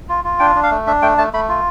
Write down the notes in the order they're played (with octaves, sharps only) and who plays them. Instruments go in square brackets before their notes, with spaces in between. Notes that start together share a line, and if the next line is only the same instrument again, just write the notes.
[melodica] F4
F4
D4 G5
D4
F5
A3
D4 E5
A3 G5
A3 A5
A3 B5
F4